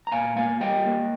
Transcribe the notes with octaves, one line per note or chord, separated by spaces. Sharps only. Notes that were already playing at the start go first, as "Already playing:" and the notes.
A#5
A#2 F5 G#5
A#3 F5 G#5
G3 D#5 G5
A#3